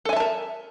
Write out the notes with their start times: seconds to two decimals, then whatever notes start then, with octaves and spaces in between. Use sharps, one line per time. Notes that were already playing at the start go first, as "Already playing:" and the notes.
0.05 A4
0.09 G#5
0.13 E5
0.16 A5
0.20 A#4